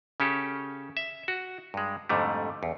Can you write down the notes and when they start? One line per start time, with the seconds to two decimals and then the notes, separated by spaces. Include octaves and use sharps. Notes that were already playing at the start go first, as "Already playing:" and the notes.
0.20 C#3 C#4 G4 A4
0.97 E5
1.28 F#4
1.74 G2 G#3
2.09 F2 G#2 D3 G3 A3
2.63 E2